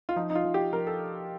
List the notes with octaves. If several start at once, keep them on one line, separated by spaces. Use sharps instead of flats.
F4
F3 D#4
D#4
F4
F3
G4
F3 A#4
A4